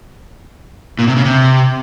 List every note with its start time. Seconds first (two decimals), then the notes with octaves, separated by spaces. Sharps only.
0.99 A#2
1.07 C3
1.16 C#3
1.25 C3